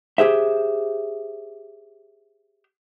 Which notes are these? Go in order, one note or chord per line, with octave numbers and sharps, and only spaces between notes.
G4 G#4 C5 E5